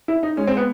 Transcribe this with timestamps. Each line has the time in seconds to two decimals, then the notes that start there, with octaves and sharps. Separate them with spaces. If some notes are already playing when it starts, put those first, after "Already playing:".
0.08 E4
0.23 D#4
0.37 G#3 C#4
0.47 C4
0.57 B3